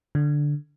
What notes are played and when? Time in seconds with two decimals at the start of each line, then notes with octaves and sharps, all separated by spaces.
0.15 D3